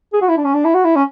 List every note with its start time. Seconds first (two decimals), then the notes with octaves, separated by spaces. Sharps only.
0.13 G#4
0.22 F#4
0.29 E4
0.37 D4
0.45 C#4
0.54 D4
0.65 E4
0.74 F#4
0.85 E4
0.96 C#4